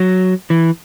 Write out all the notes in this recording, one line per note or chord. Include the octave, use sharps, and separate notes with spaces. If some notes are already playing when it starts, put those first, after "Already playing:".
Already playing: F#3
E3